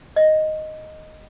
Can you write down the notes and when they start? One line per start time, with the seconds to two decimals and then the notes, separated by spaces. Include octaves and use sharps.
0.16 D#5